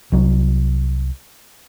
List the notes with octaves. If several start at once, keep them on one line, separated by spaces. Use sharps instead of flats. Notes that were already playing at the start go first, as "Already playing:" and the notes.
C2 F#3